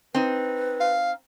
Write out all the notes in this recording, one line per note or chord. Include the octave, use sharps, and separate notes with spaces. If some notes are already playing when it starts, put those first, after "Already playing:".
C4 D#4 B4
F5